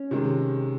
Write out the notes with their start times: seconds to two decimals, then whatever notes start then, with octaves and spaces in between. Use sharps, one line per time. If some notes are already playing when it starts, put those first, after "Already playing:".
Already playing: C#4
0.11 C3 D#3 G#3